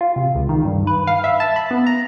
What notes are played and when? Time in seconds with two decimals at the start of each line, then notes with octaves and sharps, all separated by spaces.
0.01 F4
0.16 C3
0.35 C#2
0.49 D#3
0.65 G2
0.87 B4
1.07 F5
1.24 E5
1.40 A5
1.56 B5
1.71 B3
1.87 A#5